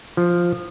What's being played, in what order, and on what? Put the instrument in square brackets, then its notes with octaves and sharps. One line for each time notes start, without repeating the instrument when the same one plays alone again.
[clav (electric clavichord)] F3